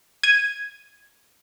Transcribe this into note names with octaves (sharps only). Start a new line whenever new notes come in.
G#6 D#7